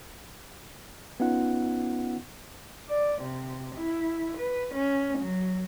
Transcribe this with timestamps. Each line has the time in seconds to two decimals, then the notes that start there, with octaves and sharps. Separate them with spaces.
1.20 B3 C#4 D#4 F4 F#5
2.89 D5
3.22 C3
3.76 E4
4.38 B4
4.75 C#4
5.19 F#3